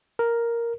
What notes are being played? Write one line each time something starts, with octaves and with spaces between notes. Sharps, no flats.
A#4